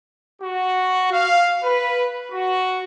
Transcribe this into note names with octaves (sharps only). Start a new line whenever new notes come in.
F#4
F5
B4
F#4